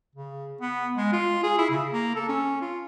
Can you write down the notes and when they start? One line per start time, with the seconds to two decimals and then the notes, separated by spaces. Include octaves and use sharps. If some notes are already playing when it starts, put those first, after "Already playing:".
0.15 C#3
0.61 B3
0.96 G#3
1.12 F4
1.43 G#4
1.58 E4
1.70 C#3
1.91 A#3
2.15 A4
2.29 C#4
2.61 F4